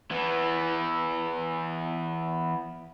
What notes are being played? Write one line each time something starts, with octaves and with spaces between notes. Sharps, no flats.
E3 B3